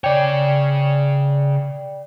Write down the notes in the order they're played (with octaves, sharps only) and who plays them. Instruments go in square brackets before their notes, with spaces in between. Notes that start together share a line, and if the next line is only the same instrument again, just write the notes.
[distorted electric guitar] C#3 C#5 [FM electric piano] D5 G5